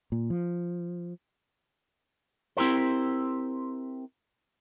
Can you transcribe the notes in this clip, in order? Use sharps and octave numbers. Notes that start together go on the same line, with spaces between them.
A#2
F3
C4 E4 G4 A#4 C5